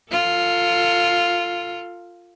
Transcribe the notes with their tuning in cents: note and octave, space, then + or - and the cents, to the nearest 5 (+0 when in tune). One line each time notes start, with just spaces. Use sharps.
F4 +0 A4 +35